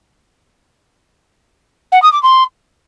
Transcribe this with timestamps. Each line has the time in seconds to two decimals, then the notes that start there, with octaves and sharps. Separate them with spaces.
1.92 F#5
2.02 D#6
2.13 D6
2.23 C6